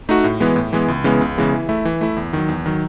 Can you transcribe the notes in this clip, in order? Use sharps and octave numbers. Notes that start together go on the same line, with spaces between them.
A3 D#4 F#4
A2
E3 G#3 B3
A2
E3 G#3 B3
C#2
C#3 E3 G#3 B3
C#2
C#3 E3 G#3 B3
E3
A3 E4
E3
A3 E4
E2
D#3 F#3
E2
D#3 F#3